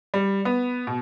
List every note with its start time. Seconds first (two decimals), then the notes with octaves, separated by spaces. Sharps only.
0.14 G3
0.45 B3
0.87 B2